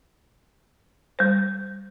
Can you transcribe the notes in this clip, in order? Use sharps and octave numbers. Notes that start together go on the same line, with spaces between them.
G3 C5